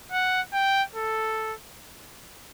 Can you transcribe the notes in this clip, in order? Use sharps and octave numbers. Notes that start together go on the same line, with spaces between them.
F#5
G5
A4